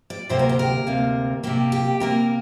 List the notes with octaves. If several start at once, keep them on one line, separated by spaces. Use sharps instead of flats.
D5
D2 C3 A#3 C5
A#4
G4
A#4
D2 C3 A#3
C3 A#3 G4
G4
C3 A#3 A#4